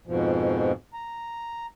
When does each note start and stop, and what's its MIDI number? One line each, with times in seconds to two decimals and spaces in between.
0.07 0.72 41
0.07 0.72 44
0.07 0.72 47
0.07 0.72 53
0.94 1.66 82